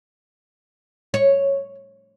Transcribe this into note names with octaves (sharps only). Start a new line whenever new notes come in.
C#5